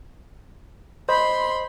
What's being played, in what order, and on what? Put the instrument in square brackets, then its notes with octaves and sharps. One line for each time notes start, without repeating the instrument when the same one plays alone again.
[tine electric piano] C5 D#5 [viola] B5 C6